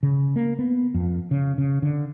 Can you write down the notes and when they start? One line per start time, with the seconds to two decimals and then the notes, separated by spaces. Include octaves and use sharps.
0.03 C#3
0.36 A#3
0.59 B3
0.94 F2
1.31 C#3
1.58 C#3
1.82 D3